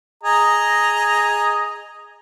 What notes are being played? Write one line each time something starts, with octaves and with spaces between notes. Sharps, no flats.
G#4 D#5 A#5